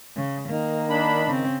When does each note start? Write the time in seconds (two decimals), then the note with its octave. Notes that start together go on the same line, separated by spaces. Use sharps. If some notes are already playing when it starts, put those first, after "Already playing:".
0.16 C#3
0.48 D#3 A#3
0.90 D4 B5
1.27 C#3 C4